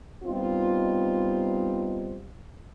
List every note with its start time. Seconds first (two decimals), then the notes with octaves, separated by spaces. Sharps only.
0.24 G3 B3 C4 D#4 F4